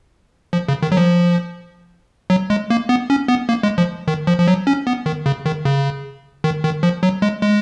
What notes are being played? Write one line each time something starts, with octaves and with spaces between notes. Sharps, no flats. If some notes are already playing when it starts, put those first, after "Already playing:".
F3
C#3
D#3
F#3
F3
F#3
G#3
A#3
B3
C#4
B3
A#3
G#3
F3
D#3
F3
F3
F#3
C#4
B3
D#3
C#3
D#3
C#3
D#3
D#3
F3
F#3
G#3
G#3